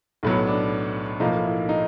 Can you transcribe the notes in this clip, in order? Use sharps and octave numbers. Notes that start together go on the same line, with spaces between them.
B1 A2 F#3 B3
D4
B1 A2 F3 A#3 D#4
E4
D#4